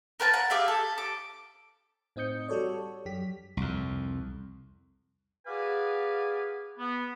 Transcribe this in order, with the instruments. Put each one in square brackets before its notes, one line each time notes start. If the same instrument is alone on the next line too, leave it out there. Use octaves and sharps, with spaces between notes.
[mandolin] A#4 B4 G#5 A5
F#5
G4 G#4 E5 F5
A4
D6
[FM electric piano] A2 C4 D#4 D#6 G6 C#7
G3 F#4 A4 C#5 D5
F#2 F#3 G4 B6
[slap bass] C2 F2
[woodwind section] F#4 G#4 B4 D5 F5 G#5
B3